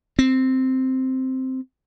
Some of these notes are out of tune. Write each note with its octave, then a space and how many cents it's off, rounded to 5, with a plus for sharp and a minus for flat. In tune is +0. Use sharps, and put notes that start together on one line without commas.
C4 -5